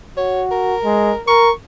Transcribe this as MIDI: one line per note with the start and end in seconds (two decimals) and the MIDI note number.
0.17 0.75 66
0.17 0.42 73
0.51 1.21 70
0.85 1.13 56
1.28 1.50 70
1.28 1.51 85